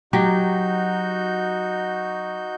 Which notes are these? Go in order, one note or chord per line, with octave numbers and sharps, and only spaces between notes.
F#3 D#4 F#4 G4 G6